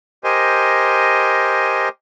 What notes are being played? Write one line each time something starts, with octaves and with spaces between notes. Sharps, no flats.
G4 A#4 C5 D#5 G#5